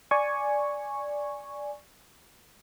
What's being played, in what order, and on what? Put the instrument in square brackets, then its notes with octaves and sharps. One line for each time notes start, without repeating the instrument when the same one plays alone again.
[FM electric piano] D5 G#5 C#6